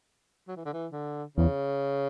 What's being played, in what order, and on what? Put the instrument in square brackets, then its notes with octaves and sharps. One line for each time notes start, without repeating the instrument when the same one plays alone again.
[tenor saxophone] F#3
E3
D3
E3
D3
[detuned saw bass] E2 [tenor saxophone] C#3